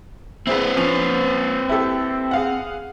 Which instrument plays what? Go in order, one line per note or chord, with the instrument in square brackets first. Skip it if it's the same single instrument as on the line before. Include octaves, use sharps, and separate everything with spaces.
[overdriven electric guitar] C4 B4 [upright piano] E4 G#4
[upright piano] F3 C#4 F7
E4 G4 A4
G#4 F5 F#5